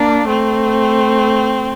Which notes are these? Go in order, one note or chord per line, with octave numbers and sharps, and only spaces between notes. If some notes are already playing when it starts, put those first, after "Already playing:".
Already playing: A#3 D4
A3 C4